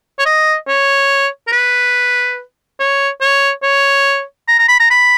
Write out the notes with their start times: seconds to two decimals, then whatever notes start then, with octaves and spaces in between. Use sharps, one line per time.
0.19 C#5
0.26 D#5
0.68 C#5
1.47 A#4
1.52 B4
2.80 C#5
3.21 C#5
3.63 C#5
4.48 A#5
4.59 A#5
4.69 B5
4.80 A#5
4.91 B5